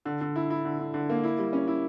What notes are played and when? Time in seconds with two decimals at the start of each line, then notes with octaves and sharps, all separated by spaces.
0.05 D3
0.21 D3
0.36 E4
0.50 E4
0.65 D3
0.79 D3
0.94 D3
1.09 A#3
1.24 E4
1.39 G3
1.53 C#4
1.68 E4